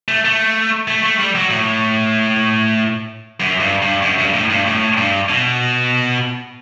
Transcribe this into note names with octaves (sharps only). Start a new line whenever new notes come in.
A3
A3
A3
A3
G3
F#3
A2
F#2
G2
G2
F#2
G2
A2
G2
A2
G2
B2